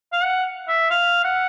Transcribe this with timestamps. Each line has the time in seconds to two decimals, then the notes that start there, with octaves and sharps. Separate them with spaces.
0.12 F5
0.23 F#5
0.68 E5
0.90 F5
1.24 F#5